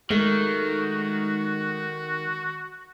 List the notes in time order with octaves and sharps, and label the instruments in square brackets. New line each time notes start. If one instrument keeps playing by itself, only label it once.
[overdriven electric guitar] D#3 [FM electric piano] G#3 [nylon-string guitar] A3 [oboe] F#4